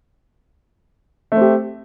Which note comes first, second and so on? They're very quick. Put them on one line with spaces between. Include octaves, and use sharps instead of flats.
A3 C4 G4